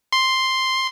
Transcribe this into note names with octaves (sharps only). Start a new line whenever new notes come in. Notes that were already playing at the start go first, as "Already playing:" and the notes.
C6